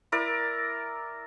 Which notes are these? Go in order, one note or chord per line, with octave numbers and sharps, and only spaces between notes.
E4 A#4 D5